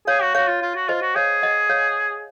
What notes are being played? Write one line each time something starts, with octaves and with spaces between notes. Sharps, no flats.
G#4 C#5 F5
F#4
F#4 C#5 F5
F4
F4
F#4
F4 C5 D#5
F#4
G#4 C#5 F5
D#5 F#5
C#5 F5